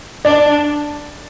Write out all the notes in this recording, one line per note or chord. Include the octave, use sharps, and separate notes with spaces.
D4 D5